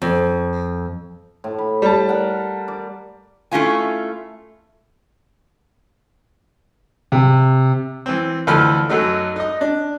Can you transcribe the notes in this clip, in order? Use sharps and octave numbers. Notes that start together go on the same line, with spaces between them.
F2
A2
B5
G3 A5
A#4 F#5
D5
A3 C#4 E4 F4 G#5
C3
E3 C4
D2 E3 F3 A4 B5 F6
F#2 F#3 A3 D#4
D#4 D#5
D4